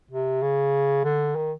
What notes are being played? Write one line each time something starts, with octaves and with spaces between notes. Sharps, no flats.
C3
C#3
D3
D#3